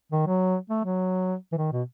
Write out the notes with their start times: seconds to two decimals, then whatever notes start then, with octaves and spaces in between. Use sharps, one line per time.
0.12 D#3
0.27 F#3
0.70 A3
0.84 F#3
1.52 E3
1.58 D#3
1.72 B2